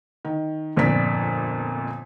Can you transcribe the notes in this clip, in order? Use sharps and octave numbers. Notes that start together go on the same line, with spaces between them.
D#3
G1 F2 A#2 D5 B6